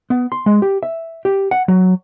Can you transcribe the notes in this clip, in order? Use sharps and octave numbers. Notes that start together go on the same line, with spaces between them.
B3
C6
G#3
G4
E5
G4
F#5
F#3